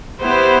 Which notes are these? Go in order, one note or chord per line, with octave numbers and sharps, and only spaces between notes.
B3 E4 G4 C5